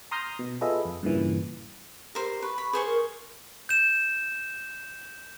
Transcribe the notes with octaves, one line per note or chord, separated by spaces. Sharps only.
A#5 C6 D#6 F6 G6 A#6
B2
F4 G#4 A4 B4 D#5 E5
F2
G2 A#2 C#3 E3
G4 A#4 C5
B4 C#6
B5
G#4 B4 C5 C#6
A#4
G6 E7